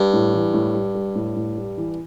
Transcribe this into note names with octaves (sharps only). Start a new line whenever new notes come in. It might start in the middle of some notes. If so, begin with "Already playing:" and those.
Already playing: G2
A2
E3
A2
G3
G3
A2
A2
G3
E3